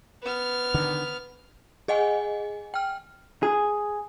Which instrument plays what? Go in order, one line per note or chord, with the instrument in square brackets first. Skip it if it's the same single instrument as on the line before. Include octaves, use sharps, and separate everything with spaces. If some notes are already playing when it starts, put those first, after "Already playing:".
[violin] B3 F6
[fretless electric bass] D3 D#3
[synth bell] G#4 D#5 F#5 G#5
G5 F6
[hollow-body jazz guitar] G#4